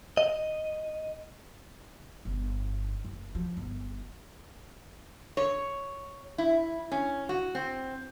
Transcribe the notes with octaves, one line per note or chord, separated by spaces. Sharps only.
D#5
G1
F#1
F3
G1
C#5
E4
C#4
F#4
C4